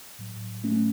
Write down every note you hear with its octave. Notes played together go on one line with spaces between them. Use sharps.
A2 F#3
A3 C#4